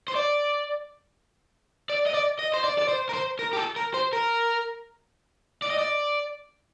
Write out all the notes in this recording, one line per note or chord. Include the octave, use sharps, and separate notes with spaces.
C5
D5
D5
D#5
D5
D#5
C5
D5
D5
C5
A#4
C5
A#4
G4
A4
A#4
C5
A#4
D5
D#5
D5